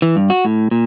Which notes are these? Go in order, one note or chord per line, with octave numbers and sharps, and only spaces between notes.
E3
G2
F#4
A2
A#2